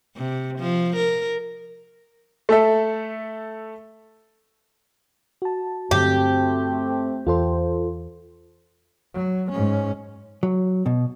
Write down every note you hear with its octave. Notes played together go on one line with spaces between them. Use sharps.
C3
F3
A#4
A3 A4 E5
F#4 A5
G2 D3 F#3 A3 C4 G4
E2 F4 A4 C5
F#3
G#2 C#4
F#3
B2